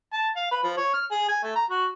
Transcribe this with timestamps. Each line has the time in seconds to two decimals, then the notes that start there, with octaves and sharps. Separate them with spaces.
0.13 A5
0.36 F5
0.51 B4
0.64 F3
0.77 C#5
0.94 F6
1.11 G#4
1.28 G#5
1.43 A3
1.56 A#5
1.70 F#4